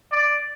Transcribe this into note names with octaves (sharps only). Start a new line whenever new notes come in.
D5